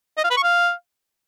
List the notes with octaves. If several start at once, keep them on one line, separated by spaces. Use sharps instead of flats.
D#5
F5
B4
C#6
F5